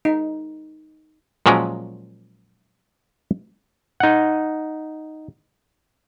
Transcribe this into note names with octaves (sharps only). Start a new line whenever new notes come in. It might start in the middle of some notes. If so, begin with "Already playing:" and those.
D#4
A#2 F3 F#3 G#3 C#4 A#4
D#4 F#5